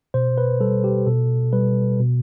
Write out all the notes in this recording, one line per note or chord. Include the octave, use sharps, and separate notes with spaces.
B2 C5
B4
G3 A4
G4
B2 A4
G3 B4
B2